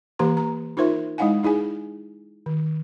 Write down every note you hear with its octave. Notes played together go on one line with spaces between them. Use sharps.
E3 A#3 G4 C5 A#5 C6
A#5
D#4 F4 A#4 C5 E5 C6
G#3 D#4 E4 F5 F#5 G#5
D#4 E4 G#4 G#5
D#3